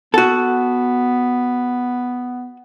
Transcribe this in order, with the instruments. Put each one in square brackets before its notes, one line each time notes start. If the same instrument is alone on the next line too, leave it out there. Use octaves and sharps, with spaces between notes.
[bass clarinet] B3 [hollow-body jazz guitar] F#4 A4